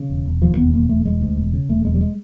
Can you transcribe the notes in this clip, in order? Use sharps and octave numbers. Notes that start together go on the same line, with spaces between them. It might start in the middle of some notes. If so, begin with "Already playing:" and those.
Already playing: C#3
E1
E1
D#2 F3
E1 B3
E1 A#3
E1 A3
E1 G#3
D2
E1
C#3
E1 A3
E1 G#3
G3
G#3